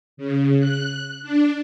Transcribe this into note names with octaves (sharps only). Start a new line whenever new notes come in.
C#3
F#6
D4